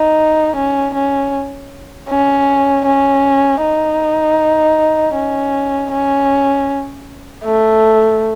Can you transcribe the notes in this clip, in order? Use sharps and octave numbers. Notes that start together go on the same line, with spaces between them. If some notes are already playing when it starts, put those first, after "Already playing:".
Already playing: D#4
C#4
C#4
C#4
C#4
D#4
C#4
C#4
A3